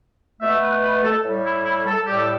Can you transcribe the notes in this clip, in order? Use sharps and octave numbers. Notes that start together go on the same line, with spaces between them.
B2 A3 E5
B4
B4
A4
A2 G3
E4
E4
A4
A2 G3 G4
A4